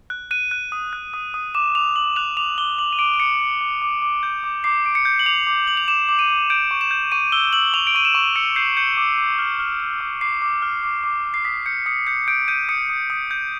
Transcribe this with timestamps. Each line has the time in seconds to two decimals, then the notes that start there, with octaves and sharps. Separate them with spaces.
0.10 F#6
0.31 F#6 D#7
0.51 F#6
0.72 D#6
0.93 F#6
1.14 D#6
1.34 D#6
1.55 D6 E7
1.75 D6 F7
1.96 D6 F#7
2.16 F#6 F7
2.37 D6 F7
2.58 D6 G7
2.78 D6 F#7
2.93 D#7
2.99 D6 D7
3.14 D7
3.20 D6 C#7
3.41 D6
3.61 D6
3.82 D6
4.02 D6
4.23 G6
4.44 D6
4.64 D6 C7
4.85 D6 D7
4.95 C#7
5.05 G6
5.19 F#7
5.26 D6 F7
5.47 D6
5.67 D6 F#7
5.77 F7
5.88 D6 E7
6.09 D6
6.19 D#7
6.30 D6
6.50 G6 D7
6.71 C#6
6.81 E7
6.91 G6
7.12 C#6 D#7
7.32 E6 G7
7.53 E6 F#7
7.74 C#6 F7
7.87 D7
7.95 C#6 D#7
8.05 E7
8.15 C#6
8.36 E6 C#7
8.56 G6 C7
8.77 G6 C#7
8.97 D6
9.18 D6
9.39 F6
9.59 F6
9.80 F6
10.01 D6
10.21 D6 C7
10.42 D6
10.62 F6
10.83 D6
11.04 D6
11.24 D6
11.34 C7
11.45 D#6 B6
11.66 G6 C#7
11.86 D#6 C#7
12.07 G6 C#7
12.28 G6 D7
12.48 G6 D#7
12.69 D#6 C#7
12.89 D#6
13.10 D#6
13.31 G6